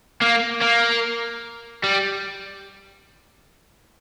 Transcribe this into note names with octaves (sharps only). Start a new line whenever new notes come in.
A#3
A#3
G3